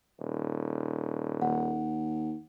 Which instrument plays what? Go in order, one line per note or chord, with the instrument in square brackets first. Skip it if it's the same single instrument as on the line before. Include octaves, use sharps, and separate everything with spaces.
[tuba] D#1
[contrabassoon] D#2 [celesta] F#5